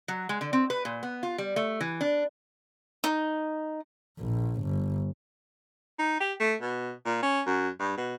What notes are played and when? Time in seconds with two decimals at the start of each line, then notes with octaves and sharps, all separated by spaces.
0.08 F#3
0.29 G#3
0.41 D3
0.53 C4
0.70 B4
0.85 A#2
1.03 B3
1.23 F4
1.38 G3
1.56 A3
1.81 E3
2.01 D4
3.04 D#4
4.20 A#1
4.62 G1
5.99 D#4
6.20 G4
6.40 A3
6.61 B2
7.06 A#2
7.22 C#4
7.46 F#2
7.80 G2
7.97 B2